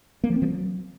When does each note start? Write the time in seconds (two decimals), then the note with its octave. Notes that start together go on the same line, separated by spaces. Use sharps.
0.24 A#3
0.30 F3
0.36 C4
0.42 F3
0.48 F#3